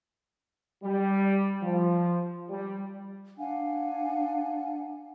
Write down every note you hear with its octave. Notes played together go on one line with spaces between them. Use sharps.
G3
F3
G3
D4 F5 F#5 G#5